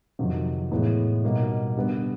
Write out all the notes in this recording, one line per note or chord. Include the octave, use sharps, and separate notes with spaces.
F2 C3 D#3 F#3
A2 E3 G#3 B3
B2 G3 A#3 D#4
D3 G3 B3